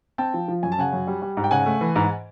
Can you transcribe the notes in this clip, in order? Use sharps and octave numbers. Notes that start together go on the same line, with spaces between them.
C4 G5 A5
F3
F3
F#2 G#5
A5
C#3 F#5 G#5
F#2
G3
G3
G#2
G5
C#3 F#5 G#5
A3
E3
G#2